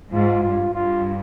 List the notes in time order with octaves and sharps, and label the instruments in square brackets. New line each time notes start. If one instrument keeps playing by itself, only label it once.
[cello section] G#2 [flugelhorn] F4
[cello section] G2 [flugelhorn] F4
[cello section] G2 [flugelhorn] F4